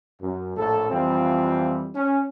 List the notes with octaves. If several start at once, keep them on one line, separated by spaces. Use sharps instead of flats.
F#2
A#1 A2 A4
F2 E3 G3 C4 F4
C#4